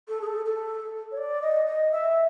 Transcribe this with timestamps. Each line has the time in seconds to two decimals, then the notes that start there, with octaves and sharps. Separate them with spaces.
0.08 A4
0.21 G#4
0.26 A4
0.45 A4
1.11 C#5
1.17 D5
1.42 D#5
1.66 D#5
1.91 E5